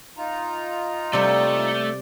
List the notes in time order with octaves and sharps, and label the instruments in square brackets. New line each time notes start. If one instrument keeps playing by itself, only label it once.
[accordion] D#4 F4 A#5
[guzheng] C3 G3 [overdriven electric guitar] A3 [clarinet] D5